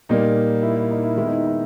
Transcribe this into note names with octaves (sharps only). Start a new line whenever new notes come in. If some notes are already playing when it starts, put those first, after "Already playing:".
A#2 G3 A#3 D#4
E4
E4
D#4
E4
D#3 G#3 B3 E4
D#4
D#4